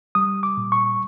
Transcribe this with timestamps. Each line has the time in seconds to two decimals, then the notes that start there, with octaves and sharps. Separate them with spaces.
0.15 G3 D#6
0.43 D6
0.57 A#2
0.72 C#6